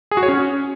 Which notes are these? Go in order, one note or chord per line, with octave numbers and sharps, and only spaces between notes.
G#4
F#4
C#5
C#4